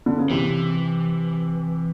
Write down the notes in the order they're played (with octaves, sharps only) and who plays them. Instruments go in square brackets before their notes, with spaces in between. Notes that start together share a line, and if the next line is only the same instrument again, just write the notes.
[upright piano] D3
C#3
[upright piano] C3 [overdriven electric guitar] E3